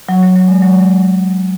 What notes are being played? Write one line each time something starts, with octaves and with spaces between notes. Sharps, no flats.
F#3
F#3
F#3
G#3
F#3